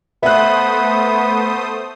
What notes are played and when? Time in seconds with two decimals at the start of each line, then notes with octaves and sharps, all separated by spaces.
0.23 A3 B3 C5 E5 D#6 F#6